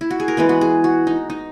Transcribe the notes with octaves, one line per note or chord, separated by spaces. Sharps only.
E4
F#4
G#4
A#4
E3 G#3 B3 B4
F#4
G#4
F#4
D#4
D#4